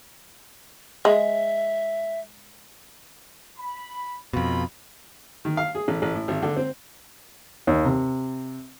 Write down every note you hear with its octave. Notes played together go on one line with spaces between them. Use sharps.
G#3 E5
B5
F2 B2 D#4 F4 B5
D#3
F5
G#4
A1
A1
A2
G#1
D3
C4
D#2
C3